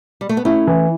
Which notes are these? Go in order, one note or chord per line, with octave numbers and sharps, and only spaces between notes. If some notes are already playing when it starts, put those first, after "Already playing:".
G3
A3
B3
A3 C#4 E4
E3